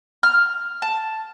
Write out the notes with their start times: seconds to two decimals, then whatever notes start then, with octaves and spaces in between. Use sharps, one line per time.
0.23 F6
0.82 A5